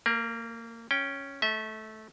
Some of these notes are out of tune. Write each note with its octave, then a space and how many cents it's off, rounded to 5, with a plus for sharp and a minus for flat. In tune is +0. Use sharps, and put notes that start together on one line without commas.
A#3 -25 A#4 +30
C#4 +0 G5 +0
A3 -10 E5 -30